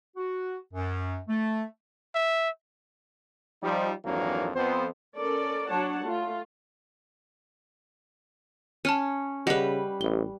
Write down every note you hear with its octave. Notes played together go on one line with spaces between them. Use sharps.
F#4
F#2
A3
E5
F3 G3 D#4
G#1 F2 E3 F#3 A#3 D4
F2 B3 C5
C#4 A4 A#4 D5
F#3 D4 C#5 F#5 A5
A3 F4
C#4 A5 F6 D#7
C#3 G3 B4 D#5 F#5
A1 G7